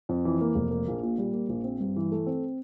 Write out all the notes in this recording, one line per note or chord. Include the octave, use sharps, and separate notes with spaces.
F2
E3
A#3
F1
A#3
A#1
A#2
G3
A#3
A#1
C4
G2
E3
A3
C4